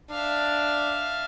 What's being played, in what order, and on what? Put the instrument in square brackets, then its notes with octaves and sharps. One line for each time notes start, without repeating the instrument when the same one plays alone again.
[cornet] D4 [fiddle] E5 F5